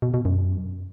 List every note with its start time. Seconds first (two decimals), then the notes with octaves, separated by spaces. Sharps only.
0.02 B2
0.14 B2
0.25 F#2